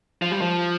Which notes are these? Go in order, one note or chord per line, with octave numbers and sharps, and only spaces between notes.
F3
G3
F3